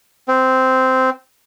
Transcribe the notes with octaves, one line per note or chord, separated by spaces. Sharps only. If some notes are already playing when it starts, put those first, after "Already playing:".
C4